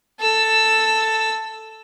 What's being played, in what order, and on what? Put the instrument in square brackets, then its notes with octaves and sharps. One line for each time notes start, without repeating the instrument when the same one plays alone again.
[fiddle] A4 E6